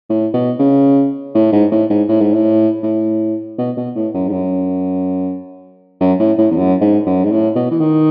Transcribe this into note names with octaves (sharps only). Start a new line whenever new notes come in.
A2
B2
C#3
A2
G#2
A2
G#2
A2
G#2
A2
A2
B2
B2
A2
F#2
G#2
F#2
F#2
A2
A2
E2
F#2
G#2
F#2
G#2
A2
B2
E3
D#3